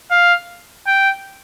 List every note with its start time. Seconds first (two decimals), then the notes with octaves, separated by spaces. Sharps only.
0.11 F5
0.87 G5